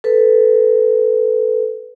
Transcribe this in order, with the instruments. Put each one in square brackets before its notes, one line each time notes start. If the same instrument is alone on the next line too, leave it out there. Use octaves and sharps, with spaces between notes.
[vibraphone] A4 B4